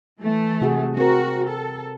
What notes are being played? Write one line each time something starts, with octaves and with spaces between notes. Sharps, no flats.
E3 A3
C3 F#4 G#4
C4 F#4 A#4
A4